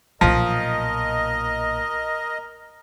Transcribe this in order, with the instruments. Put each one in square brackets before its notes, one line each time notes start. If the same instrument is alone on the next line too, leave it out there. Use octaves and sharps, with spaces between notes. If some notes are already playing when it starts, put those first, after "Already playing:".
[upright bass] B1 A#2 [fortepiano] F3 [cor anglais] A#4 [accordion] D#5